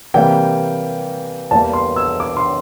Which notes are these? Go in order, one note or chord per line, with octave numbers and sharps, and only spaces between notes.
C3 E3 G3 A#3 G5
E2 E3 G3 A#3 A5
C6
E6
D6
C6